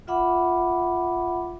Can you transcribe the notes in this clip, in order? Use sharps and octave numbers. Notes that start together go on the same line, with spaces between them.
F4 E5 F#5 B5 D6